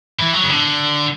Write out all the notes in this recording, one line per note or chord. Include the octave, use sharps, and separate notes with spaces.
E3
F#3
C#3
D3